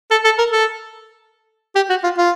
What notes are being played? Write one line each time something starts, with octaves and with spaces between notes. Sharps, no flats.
A4
A4
A#4
A4
G4
F#4
F4
F4